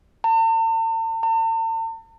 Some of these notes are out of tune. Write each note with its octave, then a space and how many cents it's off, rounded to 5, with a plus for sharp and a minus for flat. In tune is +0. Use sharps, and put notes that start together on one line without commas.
A5 +45
A5 +45